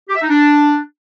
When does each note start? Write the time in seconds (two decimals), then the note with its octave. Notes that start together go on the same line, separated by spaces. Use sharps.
0.09 G4
0.16 E5
0.22 D#4
0.29 D4